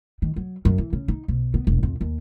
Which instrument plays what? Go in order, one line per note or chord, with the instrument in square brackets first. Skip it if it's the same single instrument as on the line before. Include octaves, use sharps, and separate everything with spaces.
[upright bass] D#3
F#3
F#2
E3
C#3
D#4
B1
B3
E1
F2
D#2